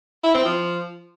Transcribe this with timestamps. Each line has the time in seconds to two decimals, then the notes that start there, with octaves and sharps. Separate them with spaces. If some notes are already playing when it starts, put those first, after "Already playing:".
0.24 E4
0.34 C4
0.45 F3